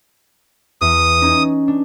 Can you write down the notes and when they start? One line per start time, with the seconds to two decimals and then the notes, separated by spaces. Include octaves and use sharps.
0.81 E2 D#6
1.22 C#4 D#4
1.68 D4